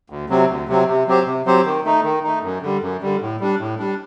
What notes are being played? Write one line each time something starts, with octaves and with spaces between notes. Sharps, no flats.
D2
C3 F#3 C4
D2
C3 F#3 C4
C3
F#3 C4 G4 C5
C3
F#3 C4 G4 C5
D#3
A3 D#4
D#3
A3 D#4
F#2
D3 G3
F#2
D3 G3
A2
G3 D4
A2
G3 D4